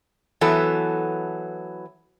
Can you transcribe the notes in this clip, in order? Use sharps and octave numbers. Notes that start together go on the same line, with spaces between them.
E3 F#3 B3 A4